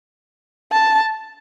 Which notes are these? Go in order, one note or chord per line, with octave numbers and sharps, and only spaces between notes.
A5